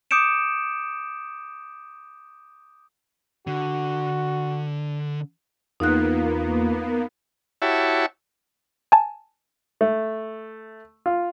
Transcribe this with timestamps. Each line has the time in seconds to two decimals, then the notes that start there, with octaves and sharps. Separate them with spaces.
0.11 D6 D#6 G6 C#7 D7 E7
3.47 D3 F#4
5.80 E2 A#3 B3 D#4 F4 F#6
7.62 E4 F#4 G4 C#5 E5 A5
8.92 G#5 A5
9.81 A3
11.06 F4